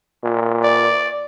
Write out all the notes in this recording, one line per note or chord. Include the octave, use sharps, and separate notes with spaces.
A#2
D5